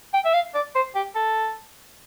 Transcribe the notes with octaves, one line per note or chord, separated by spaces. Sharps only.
G5
E5
F5
D5
C5
G4
A4